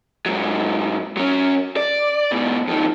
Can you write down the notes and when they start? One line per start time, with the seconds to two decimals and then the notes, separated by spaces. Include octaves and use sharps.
0.26 G#2 F#3
1.17 F#3 C#4
1.77 D5
2.32 G#2 B2
2.67 F2 D#3